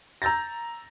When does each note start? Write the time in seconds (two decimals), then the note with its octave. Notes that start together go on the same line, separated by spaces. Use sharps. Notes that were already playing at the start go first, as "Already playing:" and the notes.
0.22 A#5 E6 G6 A6 A#6